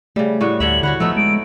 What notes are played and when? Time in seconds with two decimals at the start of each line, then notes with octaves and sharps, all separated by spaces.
0.16 C#3 G3 A3
0.41 A2 G3 F#4 C#6
0.60 D2 D3 C#5 E5 F#7
0.83 D3 F#4 C#5 F#5 B5
1.00 F3 A3 B3 D#4 E6
1.17 G#3 D7